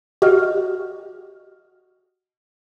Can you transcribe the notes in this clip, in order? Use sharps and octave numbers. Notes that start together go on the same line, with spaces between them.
F#4 G4 D#5 F6